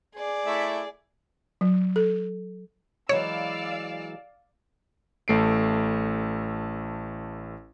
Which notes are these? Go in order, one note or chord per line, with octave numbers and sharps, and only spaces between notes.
G#4 D5
A3 E4 E5
F#3
A4
E3 F#3 G#3 C#5 D5 F5 E6
A1 A3 C7 D7